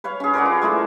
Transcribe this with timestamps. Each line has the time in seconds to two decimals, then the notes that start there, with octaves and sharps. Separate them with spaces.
0.04 B4 C#5 F5
0.20 C#4 G#4
0.34 A#4 B4 D5 F#5
0.45 F4
0.62 G#3 A3 E4 A4